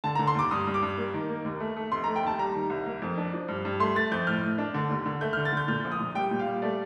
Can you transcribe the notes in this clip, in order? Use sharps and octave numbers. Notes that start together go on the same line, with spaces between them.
D3 A5
D3 A#5
C6
D#2 D6
G2 D#6
G2
D6
G2
A#3
D#3
A#3
D#2
A3
A3
F1 C6
A3 A#5
G5
D#2 A5
G3 A#5
D#3
C2
A#3
F2
D4
F3
G2
G2
A3 C6
A3 A6
F2 G6
A2 F6
A2
D4
D3
D#2
D3
A3 G6
D3 F6
A6
D3 G6
A#2 F6
A#1
D#6
A#2
G3 G5
A#2
F5
G3
A3 D5